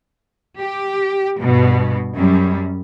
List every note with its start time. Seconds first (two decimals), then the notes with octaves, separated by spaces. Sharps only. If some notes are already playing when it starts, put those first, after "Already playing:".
0.57 G4
1.40 G2 B2
2.14 F#2 G3